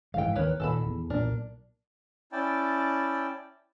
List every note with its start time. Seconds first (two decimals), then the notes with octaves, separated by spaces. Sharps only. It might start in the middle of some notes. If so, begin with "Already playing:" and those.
0.14 G#2 E3 G#3 F5 G5
0.35 D#2 A#4 B4 C#5
0.60 A#2 D#3 A4 A5 B5
0.85 E2
1.10 B1 A#2 D4 A#4
2.32 C#4 E4 D5 G5 A5